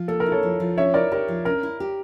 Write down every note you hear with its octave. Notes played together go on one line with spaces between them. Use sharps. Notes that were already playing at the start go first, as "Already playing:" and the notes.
Already playing: F3
A#3 A4
A#4
E4
A4 C#5
F3
F3
C#4 C#5 E5
E4 A#4 D5
G4 A#4
F3
C#4 A#4
E4
G4